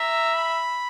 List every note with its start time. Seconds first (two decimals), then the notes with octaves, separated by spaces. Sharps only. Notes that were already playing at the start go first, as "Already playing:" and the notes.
Already playing: E5 A#5
0.34 B5